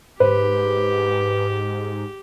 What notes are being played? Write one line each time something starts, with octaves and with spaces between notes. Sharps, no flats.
G#2 G4 B4 C5